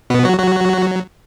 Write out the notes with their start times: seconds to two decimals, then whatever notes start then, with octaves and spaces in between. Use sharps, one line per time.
0.10 B2 B3
0.25 F#3 F#4
0.39 F#3 F#4